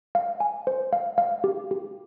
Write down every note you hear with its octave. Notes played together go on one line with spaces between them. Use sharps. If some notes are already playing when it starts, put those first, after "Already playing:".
F5
G#5
C5
F5
F5
G4
G4